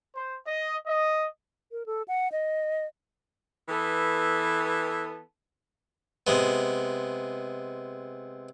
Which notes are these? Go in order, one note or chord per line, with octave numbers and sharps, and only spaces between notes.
C5
D#5
D#5
A#4
A4
F#5
D#5
E3 B3 A4
C3 G#3 B3